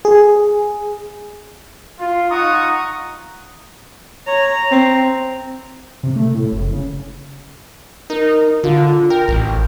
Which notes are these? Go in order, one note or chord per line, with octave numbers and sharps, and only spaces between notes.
G#4
F4
D#4 F4 F#5 A#5 C#6 D#6
C#5 A#5
C4
C3
A3
A2
F#1
C#3
D#4 A#4
D3 F4
A#4 G5
A1